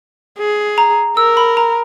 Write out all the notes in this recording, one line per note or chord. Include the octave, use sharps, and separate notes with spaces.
G#4
A#5
A#4 E6
B5
A#5